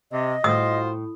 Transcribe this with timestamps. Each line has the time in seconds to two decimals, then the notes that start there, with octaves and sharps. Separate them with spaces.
0.12 C3 D#5
0.44 A2 F4 F#4 C5 D#6